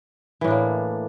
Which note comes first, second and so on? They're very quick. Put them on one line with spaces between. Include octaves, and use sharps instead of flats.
E3 A2 D4 A#3